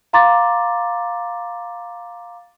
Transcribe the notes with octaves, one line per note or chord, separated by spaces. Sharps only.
F5 A#5 C6 D6 A6